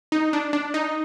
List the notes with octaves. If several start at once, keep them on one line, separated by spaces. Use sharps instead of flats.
D#4
D4
D4
D#4